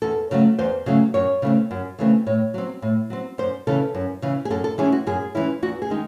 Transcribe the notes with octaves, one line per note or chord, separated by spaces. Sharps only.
E2 A4
C#3 F#3 A3
E2 C5
C#3 F#3 A3
F#2 C#5
C#3 E3 A3 C4
F#2
C#3 E3 A3 C4
A2 C#5
F#3 C4
A2
F#3 C4
F#2 C5
C#3 E3 A4
F#2
C#3 E3
G#4
F#2 A4
A4
E3 G#3 C#4 E4 G#4
F#4
F#2 G#4
E3 G#3 C#4 E4
E2 F#4
G#4
D#3 G#3 D#4